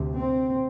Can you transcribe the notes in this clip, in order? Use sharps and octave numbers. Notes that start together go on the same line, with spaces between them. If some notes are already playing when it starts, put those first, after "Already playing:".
Already playing: D2 C3
C4